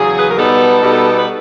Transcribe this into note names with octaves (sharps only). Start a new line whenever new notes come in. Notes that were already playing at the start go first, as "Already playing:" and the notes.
Already playing: E2 C#3 F#3 G#4
B4
A#4
B2 G3 B3 D#4 A4
B2 G3 B3 D#4
B4